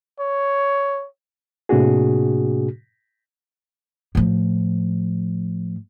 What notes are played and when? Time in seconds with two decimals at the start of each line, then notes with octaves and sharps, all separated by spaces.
0.20 C#5
1.69 A2 C3 A#3 D4 F#4 G#4
4.15 A2 F3